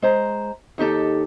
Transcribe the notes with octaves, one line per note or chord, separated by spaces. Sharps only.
G#3 C5 A#5
D#2 D#4 G4 A4